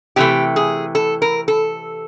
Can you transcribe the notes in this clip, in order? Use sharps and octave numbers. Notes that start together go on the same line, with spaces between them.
C3 E3 A3 G4
G#4
A4
A#4
A4